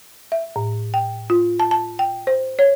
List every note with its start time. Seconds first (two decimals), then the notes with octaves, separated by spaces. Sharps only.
0.32 E5
0.56 A2
0.94 G5
1.30 F4
1.60 A5
1.71 A5
1.99 G5
2.27 C5
2.59 C#5